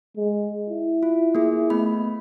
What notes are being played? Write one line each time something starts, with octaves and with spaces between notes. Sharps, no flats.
G#3
E4
F4
A#3 G#4
A3 B3 B5